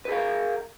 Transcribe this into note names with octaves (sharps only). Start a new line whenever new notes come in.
G#4 A#4 B4 F5